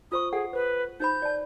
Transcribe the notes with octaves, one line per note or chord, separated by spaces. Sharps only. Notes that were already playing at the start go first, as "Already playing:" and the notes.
F4 C5 C#6 D#6
G#4 A4 F#5
B4 C5
D#4 C5 B5 G6
D5 A5